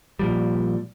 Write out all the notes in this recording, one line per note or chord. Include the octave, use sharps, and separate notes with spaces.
A#2 F3 G3